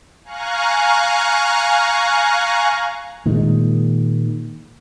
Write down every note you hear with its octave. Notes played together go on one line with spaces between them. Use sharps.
F5 G#5 A#5 C#6 F#6
A#2 D#3 G#3